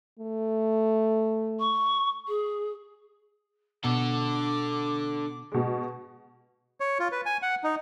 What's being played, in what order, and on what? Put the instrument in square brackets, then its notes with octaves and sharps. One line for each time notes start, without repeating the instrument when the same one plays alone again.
[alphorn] A3
[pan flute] C#6
G#4
[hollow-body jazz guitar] B2 [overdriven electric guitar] D3 A4 [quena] D6
[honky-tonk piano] B2 G#3
[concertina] C#5
F4
B4
G#5
F#5
D#4